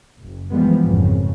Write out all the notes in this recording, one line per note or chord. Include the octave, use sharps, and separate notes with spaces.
F#1
E3 F3 G3 G#3 B3
G#1 F2 C#3